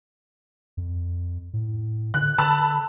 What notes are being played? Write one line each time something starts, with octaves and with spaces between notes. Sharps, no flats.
F2
A2
D3 F#6
D3 A5 B5 E6